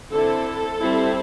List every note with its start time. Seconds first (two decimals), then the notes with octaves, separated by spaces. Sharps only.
0.10 D3 C4 E4 A4
0.78 G3 C4 E4